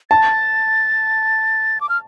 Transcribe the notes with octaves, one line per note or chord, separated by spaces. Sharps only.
A5 A6
D6
F6